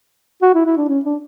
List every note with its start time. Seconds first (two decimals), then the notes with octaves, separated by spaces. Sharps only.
0.42 F#4
0.54 E4
0.66 E4
0.77 D4
0.89 C#4
1.05 D4